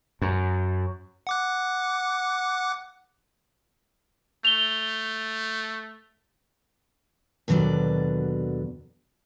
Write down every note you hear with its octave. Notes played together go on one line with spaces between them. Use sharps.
F#2
F#5 D6 F#6
A3 F7 G7
D#2 B2 D3 F#3 D5